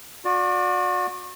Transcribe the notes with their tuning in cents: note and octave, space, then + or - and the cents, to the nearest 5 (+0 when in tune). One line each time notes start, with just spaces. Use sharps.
F#4 -40 D5 +0